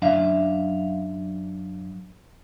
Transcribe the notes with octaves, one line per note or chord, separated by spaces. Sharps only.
F#2 D4 E5 F5